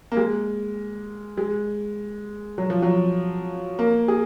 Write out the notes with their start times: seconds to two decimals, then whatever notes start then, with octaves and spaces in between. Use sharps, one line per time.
0.12 A#3
0.17 G#3
1.38 G#3
2.58 F#3
2.70 F3
2.82 F#3
3.79 A#3
4.08 G#4